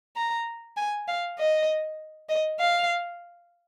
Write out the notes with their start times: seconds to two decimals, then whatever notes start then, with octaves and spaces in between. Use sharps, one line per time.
0.16 A#5
0.77 G#5
1.07 F5
1.39 D#5
2.29 D#5
2.60 F5